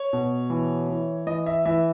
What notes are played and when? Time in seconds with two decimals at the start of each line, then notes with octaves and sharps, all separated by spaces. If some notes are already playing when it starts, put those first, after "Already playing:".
Already playing: C#5
0.13 B2
0.50 E3
0.89 E3
1.27 E3 D#5
1.46 E5
1.66 E3 E5